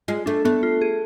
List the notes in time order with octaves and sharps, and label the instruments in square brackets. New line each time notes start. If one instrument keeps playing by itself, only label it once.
[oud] G#3 [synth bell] F4
[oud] A3 [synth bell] D4
[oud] A3 [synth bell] B3
[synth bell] F4
G#4